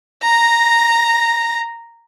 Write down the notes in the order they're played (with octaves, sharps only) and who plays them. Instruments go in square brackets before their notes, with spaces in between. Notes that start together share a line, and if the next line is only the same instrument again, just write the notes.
[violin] A#5 A#6